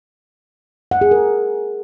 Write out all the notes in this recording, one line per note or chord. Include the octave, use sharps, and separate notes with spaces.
F#5
G#4
A#4